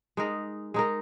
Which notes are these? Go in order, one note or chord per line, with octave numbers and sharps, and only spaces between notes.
G#3 D#4 A#4
G#3 D#4 A#4